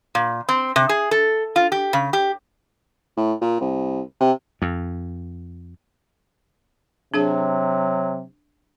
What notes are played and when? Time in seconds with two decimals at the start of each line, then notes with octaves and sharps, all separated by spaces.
0.15 A#2
0.49 C4
0.76 C3
0.89 G#4
1.11 A4
1.56 F4
1.72 G4
1.93 C#3
2.13 G4
3.17 A2
3.41 A#2
3.60 C2
4.20 C3
4.62 F2
7.14 C3 F#3 D4 G#4 A5